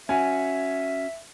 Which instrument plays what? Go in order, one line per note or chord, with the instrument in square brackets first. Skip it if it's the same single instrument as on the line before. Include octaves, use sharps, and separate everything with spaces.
[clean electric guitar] C#4 F#4 [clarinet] E5 [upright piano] G#5